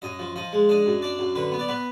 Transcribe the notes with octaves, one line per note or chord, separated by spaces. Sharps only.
F#2 D#5
F3
F3 D#5
G#3
D4 D#5
F#2
D4 D5
F#2
D3 B4
B3
D5
B3 B4